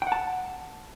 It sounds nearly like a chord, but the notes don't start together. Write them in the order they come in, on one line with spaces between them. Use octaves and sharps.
G5 F#5 A5